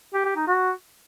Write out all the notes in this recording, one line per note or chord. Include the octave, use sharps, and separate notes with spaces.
G4
G4
D#4
F#4